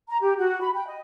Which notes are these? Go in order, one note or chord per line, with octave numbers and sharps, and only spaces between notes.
A#5
G4
F#4
B5
G5
D#5